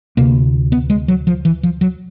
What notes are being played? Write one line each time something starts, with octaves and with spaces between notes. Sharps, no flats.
D2 C3 A#3
B3
G#3
F#3
F3
E3
F3
F#3